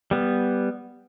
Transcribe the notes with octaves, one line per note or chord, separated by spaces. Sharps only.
G3 B3